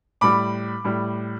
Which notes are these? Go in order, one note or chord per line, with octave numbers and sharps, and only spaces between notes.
A2 G3 B5 D6
A2 G3